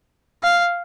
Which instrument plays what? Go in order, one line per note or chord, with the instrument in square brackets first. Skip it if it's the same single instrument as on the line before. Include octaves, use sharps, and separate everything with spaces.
[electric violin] F5